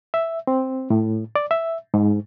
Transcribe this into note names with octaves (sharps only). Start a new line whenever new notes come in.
E5
C4
A2
D5
E5
G#2